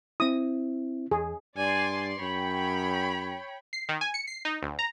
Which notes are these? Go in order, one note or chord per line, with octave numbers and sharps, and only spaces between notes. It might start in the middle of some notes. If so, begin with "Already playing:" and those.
C4 E4 D#6
E2 G#4
G2 D5 G#5 C6
F#2 C#5 G5 B5
C7
D#3
G#5
C#7
C7
D#4
D2
A#5